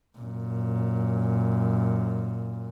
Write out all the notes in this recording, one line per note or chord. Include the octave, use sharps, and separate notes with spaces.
F#2 A#2